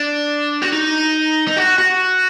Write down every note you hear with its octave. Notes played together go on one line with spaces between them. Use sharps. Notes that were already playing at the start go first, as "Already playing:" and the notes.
Already playing: D4
F#4
D#4
D#4
F#4
F#4